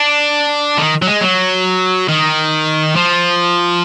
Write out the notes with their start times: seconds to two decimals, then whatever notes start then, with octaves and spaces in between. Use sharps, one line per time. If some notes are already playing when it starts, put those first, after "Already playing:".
Already playing: D4
0.78 D#3
1.02 F#3
1.07 G#3
1.21 F#3
2.09 D#3
2.96 F3